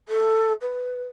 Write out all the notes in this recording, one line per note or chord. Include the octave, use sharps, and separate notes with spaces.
A4
B4